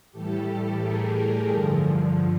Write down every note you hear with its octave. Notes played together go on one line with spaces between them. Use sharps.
A2 E3 G3 G4 A4
G#4 A#4
G#4 A#4
G2 D3 F3